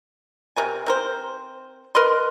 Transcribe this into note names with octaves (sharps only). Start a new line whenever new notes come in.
C3 A#4 G#5
C4 A#4 C5
A#4 B4 D#5 C6